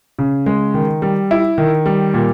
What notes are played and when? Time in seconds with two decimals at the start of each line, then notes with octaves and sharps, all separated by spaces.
0.19 C#3
0.46 G#3
0.74 D#3
1.02 G3
1.31 E4
1.58 D#3
1.86 G3
2.14 A#2